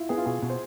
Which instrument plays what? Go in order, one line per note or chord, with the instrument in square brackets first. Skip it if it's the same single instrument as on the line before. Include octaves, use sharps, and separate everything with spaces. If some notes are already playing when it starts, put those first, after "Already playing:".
Already playing: [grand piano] E4 F4
[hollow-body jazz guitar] B3 [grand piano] G#4
[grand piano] F4
[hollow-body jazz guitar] B2 [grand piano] G#4
[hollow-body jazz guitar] B2
[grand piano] C5